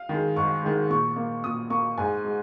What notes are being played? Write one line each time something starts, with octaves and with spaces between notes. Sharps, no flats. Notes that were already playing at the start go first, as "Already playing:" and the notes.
Already playing: F5
D#3 G#3
G#2 C#6
D#3 G#3
A#2 C#6
A#3
A#2 D#6
A#3 C#6
G#2 G#5
G#3